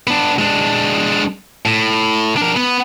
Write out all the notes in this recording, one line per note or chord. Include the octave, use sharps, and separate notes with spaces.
B3 D4
G#3 D4
A2
D4 A#4
B3